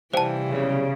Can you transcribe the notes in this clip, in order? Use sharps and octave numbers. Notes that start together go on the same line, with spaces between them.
C3 E3 G3 C5 F5 G5 A5
B1 C#3 G3 C#5